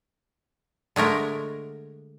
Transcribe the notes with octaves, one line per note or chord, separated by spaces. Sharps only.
D3 G#3 A3 A#4